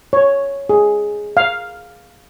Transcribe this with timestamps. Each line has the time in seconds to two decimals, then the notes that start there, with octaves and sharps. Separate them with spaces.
0.13 C#5
0.69 G#4
1.37 F5